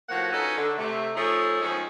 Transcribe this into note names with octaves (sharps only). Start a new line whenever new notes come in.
A2 F3 A#3 F#4 F#5
C#4 D#4 F#4 A4 B4 C#5
D3
C3 A3
F3 A3 D#4 G#4 C#5 E5
D#3 F3 G#3 C#4 C#5